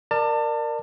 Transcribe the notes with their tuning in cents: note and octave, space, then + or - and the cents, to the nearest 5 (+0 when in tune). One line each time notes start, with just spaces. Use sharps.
A#4 +0 D5 +25 A5 +30